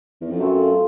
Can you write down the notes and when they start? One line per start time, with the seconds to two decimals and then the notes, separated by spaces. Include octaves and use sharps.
0.21 E2
0.31 F2
0.40 F#2 F#3 A3 C4 F4